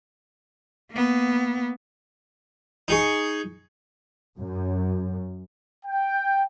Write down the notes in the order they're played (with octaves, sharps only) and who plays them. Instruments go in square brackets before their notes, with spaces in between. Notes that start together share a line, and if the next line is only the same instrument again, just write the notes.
[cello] A#3 B3
[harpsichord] D#4 G#4 C#6
[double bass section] F#2
[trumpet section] G5